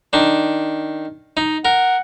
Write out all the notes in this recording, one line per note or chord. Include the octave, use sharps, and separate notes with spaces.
D#3 D4
D#4
A#4 F#5